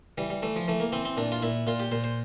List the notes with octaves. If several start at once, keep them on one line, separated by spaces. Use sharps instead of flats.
E3 G3
G3
E3 A3
F3
E3 A3
A#3
E3 C4
C4
A#2 D4
F4
A#2 E4
A#2 F4
G4
A#2 C5
C5